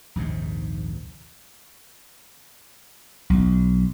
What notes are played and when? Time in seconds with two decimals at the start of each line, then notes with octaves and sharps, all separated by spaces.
0.16 A#1 D#2 G#2 C3
3.30 B1